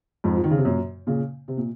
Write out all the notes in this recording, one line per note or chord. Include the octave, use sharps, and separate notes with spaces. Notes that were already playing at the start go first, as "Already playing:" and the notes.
F2 G#2
F3
D#3
C#3
C3
F#2 A#2
A#2 C#3
C3
A#2